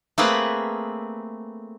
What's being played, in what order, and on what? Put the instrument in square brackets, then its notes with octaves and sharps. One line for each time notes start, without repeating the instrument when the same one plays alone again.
[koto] A3 A#3 C4 G#4 B4 F#5